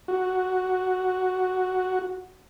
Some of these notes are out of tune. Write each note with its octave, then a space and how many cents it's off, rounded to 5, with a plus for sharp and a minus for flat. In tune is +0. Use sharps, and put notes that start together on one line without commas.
F#4 +0